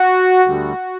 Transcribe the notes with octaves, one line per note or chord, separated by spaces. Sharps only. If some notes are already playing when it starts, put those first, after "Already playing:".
Already playing: F#4
D2 D3 G3